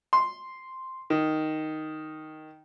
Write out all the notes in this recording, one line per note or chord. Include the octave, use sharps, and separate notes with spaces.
C6
D#3